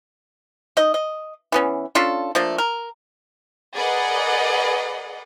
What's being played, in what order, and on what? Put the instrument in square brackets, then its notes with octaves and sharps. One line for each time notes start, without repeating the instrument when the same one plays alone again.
[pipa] D#4 D#5
D#5
E3 B3 C#4
C#4 D4 F4 A4
F3 A3 A#3 D4
A#4
[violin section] G#4 A#4 B4 D5 D#5 F#5